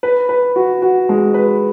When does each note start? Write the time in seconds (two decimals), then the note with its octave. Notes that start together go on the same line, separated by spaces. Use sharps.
0.03 B4
0.29 B4
0.56 F#4
0.82 F#4
1.09 G#3
1.34 B4